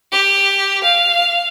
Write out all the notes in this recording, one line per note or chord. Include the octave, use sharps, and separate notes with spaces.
G4
F5